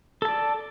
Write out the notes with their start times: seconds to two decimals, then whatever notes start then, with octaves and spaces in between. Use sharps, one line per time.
0.22 A4
0.25 A5
0.28 D5